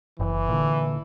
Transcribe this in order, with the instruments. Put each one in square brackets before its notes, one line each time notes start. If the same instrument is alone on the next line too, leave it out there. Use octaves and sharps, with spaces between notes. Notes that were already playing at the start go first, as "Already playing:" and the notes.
[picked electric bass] F#1 [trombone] E3
[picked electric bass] A#2 D3